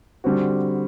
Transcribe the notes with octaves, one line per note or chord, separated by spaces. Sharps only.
D3 G3 C4 F#4